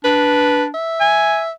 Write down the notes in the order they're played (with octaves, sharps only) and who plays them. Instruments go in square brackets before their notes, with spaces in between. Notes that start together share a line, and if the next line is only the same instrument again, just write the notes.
[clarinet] D4 [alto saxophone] B4
[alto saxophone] E5
[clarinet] G#5